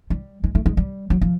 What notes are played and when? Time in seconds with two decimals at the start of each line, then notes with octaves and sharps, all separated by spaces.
0.10 G3
0.44 G#3
0.55 A3
0.66 G#3
0.77 G3
1.10 F#3
1.21 F3